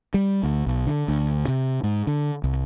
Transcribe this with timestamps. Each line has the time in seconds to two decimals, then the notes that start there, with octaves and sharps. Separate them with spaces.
0.14 G3
0.43 D2
0.67 B1
0.87 D3
1.08 D2
1.48 C3
1.83 G#2
2.07 D3
2.44 C2